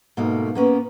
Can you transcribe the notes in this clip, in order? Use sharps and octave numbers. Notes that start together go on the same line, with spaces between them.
G#2 B2 A3 A#3
A#3 B3 C#4